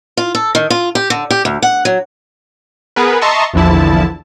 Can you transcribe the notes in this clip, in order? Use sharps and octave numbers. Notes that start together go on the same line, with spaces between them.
F4
A4
D#3
F4
G4
D3
G4
D2
F#5
F#3
B3 G#4 A#4 B4
D#5 E5 A5 A#5 C6 C#6
A#1 E2 D3 F3 E4 A5